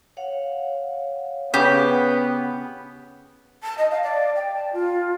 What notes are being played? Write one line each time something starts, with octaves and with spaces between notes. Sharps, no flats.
C#5 F5 F#5
C#3 B3 G4
A5
D#5
F5
D5
G5
A5
F4